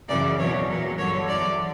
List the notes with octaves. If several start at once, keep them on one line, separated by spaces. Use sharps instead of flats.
F#2 C#3 E3 D5
E2 B2 F#3 C#5
A#2 F#3
G2 D3 F#3 C#5
E2 D3 F#3 D5